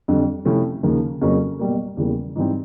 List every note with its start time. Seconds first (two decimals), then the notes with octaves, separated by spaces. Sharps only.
0.08 F2 D3 G3
0.45 C3 F3 A3 C#4 E4
0.83 D#2 C#3 F3 A#3
1.21 F2 C#3 F#3 A#3 C#4
1.59 B2 G3 A#3
1.97 E2 C#3 E3 G3 A#3
2.36 G#2 E3 G3 C4